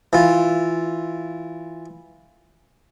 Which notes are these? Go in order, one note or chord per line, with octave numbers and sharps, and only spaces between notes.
E3 F4